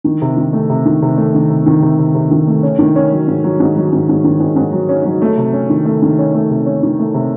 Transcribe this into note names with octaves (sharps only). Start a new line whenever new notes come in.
D#3
C3
D#3
A3
C3
D#3
C3
A3
D#3
C3
D#3
C3
C3
C3
D#3
A3
C#4
D#3
C#4
F#3
G#2
F#3
G#2
F#3
G#2
G#2
D#3
G#2
G#2
F#3
C#4
F#3
A3
C3
C#4
D#3
A3
D#3
C#4
A3
C3
C#4
D#3
A3
C3